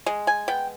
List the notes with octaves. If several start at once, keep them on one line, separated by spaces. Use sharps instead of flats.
G#3
G#5
B3 G5